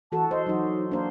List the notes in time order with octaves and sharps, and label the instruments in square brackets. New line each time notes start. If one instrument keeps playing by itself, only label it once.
[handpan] E3 F#4 A4 [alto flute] A5
[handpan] C5 [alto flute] D#5
[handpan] F#3 F#4 [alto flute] D#4
[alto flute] A#3 [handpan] D4 C5